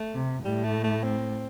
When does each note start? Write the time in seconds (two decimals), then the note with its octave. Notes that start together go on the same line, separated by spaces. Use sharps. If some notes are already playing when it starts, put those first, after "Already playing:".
Already playing: A3
0.15 C3
0.44 A2 G3
0.64 A3
0.84 A3
1.03 C4